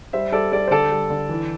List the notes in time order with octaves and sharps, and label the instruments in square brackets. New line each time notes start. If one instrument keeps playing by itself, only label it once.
[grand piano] G3 C5 E5
G3 A4 D5
G3 A4 D5
C5
D3 A4 D5
G3
D3
E3